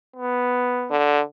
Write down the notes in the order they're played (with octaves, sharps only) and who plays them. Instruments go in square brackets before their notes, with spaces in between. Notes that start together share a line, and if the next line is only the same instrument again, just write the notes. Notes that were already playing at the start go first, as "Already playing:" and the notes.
[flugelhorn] B3
[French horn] D3